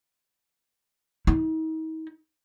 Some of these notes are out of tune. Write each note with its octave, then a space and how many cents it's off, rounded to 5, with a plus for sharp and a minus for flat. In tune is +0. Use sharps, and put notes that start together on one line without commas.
D#4 +40